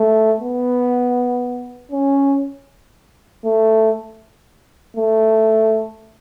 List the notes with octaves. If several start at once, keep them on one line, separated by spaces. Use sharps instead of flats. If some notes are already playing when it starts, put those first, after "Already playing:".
Already playing: A3
B3
C#4
A3
A3